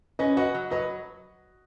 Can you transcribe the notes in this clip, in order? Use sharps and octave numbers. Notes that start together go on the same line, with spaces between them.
C#4 B4 D#5
F#4 B4 D#5
F#3
F#3 B4 D#5